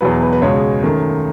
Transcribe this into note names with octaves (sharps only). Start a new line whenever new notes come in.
E2 B2 F#3 B4
B4
B4
C#2 B2 G#3 C#5
F#2 D#3 A3